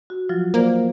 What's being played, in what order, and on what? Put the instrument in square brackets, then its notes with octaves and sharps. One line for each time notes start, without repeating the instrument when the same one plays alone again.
[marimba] F#4
F3 F#3 F4
[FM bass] A#3 [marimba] C5 D5